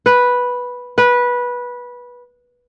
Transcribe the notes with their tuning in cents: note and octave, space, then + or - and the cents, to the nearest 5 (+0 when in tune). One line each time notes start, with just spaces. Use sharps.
B4 -5
B4 -15